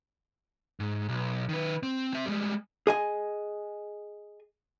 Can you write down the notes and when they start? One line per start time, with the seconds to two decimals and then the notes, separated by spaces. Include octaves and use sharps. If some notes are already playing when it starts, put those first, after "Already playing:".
0.80 G#2
1.09 B1
1.49 D#3 B4
1.83 C4
2.13 C4 E5
2.25 G3 G#3
2.87 G#4 D#5 G#5